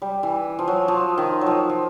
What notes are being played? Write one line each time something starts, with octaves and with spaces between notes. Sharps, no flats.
G3
E3
F3
F#3
F3
D#3
F#3
F3
F3